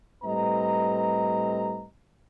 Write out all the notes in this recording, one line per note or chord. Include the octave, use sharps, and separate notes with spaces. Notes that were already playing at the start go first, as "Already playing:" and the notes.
A2 G3 C4 B4 D#5 A#5